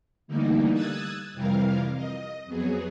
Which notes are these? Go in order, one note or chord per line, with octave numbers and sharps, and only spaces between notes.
D3 E3 G3 A3 A#3 D#4
D#6 E6 F#6 G#6 A6
F2 C3 E3 G3 A#4 F5
D#5
F2 F#3 B3 G#4